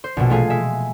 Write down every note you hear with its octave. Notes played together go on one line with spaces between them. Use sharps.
C5
A#1 B2
G#3 A3 F4 G#4
G#3 E5